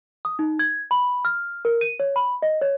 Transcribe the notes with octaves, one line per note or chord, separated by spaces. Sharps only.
D#6
D#4
G#6
B5
F6
A#4
D#7
C#5
B5
D#5
C#5